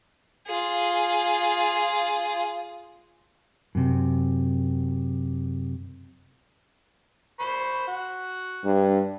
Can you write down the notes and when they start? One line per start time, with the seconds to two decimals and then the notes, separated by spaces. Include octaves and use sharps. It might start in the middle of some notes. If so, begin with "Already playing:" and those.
0.47 F4 G#4
3.75 F#2 C3
7.40 C5 B5 C#6
7.87 F#4 F#5
8.64 G2